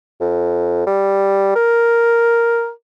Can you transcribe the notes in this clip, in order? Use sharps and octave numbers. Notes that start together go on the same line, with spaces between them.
F2
G3
A#4